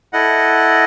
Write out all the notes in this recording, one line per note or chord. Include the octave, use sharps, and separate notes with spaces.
E4 A4 D#5 F#5